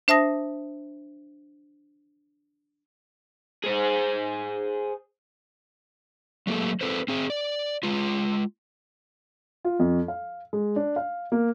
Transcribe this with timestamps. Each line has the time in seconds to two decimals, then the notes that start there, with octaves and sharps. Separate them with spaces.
0.08 D4 C5 E5 A5 D#6 A#6
3.64 G#4 C5
6.47 F#3 A3 A#3 G#4 A4
6.81 C4 A4 B4 C5
7.08 C4 G#4
7.30 D5
7.83 G#3 F4
9.65 F4
9.79 F2
10.08 F5
10.53 G#3
10.76 D4
10.96 F5
11.32 A#3